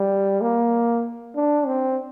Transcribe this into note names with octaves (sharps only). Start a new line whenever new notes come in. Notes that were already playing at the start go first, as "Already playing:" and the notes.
Already playing: G3
A#3
D4
C4